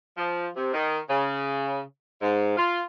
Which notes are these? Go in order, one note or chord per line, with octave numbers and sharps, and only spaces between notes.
F3
C3
D#3
C#3
G#2
F4